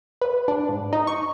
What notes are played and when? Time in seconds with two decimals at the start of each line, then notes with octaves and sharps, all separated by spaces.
0.22 B4
0.48 D4
0.69 G#2
0.93 D#4
1.07 C#6